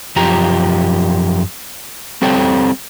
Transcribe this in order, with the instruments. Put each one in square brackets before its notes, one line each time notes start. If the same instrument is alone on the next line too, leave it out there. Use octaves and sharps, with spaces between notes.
[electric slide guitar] F#2 F3 G4 A#5
G3 C4 A4 C#5 G5